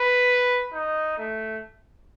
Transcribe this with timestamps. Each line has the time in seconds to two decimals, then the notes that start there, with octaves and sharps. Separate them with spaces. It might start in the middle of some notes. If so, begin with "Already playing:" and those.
Already playing: B4
0.73 D#4
1.18 A3